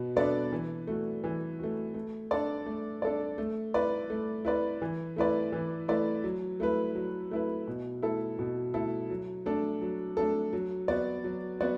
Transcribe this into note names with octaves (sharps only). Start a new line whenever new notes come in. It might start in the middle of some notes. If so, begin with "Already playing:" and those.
Already playing: B2 B3
B3 D4 A4 D5
E3
A3 F#4
E3
A3 F#4
A3
D4 A4 D5
A3
D4 A4 D5
A3
E4 B4 D5
A3
E4 B4 D5
E3
A3 E4 B4 D5
E3
A3 E4 B4 D5
F#3
A3 E4 B4
F#3
A3 E4 B4
B2
A3 E4 A4
B2
A3 E4 A4
F#3
A3 D4 A4
F#3
A3 D4 A4
F#3
B3 F#4 D5
F#3
B3 F#4 D5